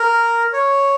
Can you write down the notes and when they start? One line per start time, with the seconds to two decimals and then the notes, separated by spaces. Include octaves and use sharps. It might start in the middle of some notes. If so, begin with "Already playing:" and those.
Already playing: A#4
0.53 C#5